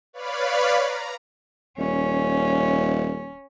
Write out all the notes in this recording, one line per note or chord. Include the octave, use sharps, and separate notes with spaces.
B4 C#5 D5 F5 B5
A#5
D#1 C#4